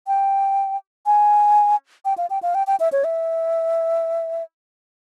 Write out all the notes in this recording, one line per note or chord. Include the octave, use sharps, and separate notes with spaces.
G5
G#5
G5
F5
G5
F5
G5
G5
E5
C#5
E5